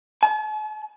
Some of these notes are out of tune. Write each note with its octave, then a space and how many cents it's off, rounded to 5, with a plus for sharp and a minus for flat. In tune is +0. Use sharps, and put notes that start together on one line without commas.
A5 -45